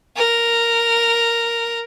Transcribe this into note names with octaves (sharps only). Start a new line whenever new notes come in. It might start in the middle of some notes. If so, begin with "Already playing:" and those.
A#4